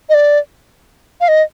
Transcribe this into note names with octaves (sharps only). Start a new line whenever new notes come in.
D#5
D5
F5
D#5